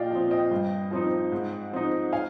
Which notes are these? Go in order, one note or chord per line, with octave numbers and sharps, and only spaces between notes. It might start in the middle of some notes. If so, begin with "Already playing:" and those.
Already playing: A#2 D5 D#5 F5 G5
F3 C4
D#5 G5
G2
F3 C4 D#4
G#2
F3 C4 D#4
F5 G#5